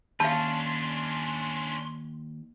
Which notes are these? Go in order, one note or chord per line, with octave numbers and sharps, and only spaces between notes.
D#2 C#4 D4 F5 A5 C6